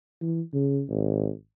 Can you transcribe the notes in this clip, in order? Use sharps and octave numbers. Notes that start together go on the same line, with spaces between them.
E3
C#3
G#1